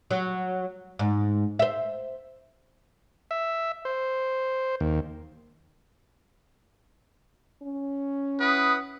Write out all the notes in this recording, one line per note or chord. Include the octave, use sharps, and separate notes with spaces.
F#3
G#2
C5 E5
E5
C5
D#2
C#4
E4 B4 F#5 D#6